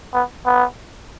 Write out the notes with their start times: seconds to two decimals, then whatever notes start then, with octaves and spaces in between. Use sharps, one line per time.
0.14 B3
0.46 B3